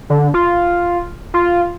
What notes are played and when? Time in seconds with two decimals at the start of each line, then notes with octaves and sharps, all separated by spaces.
0.10 D3
0.34 F4
1.34 F4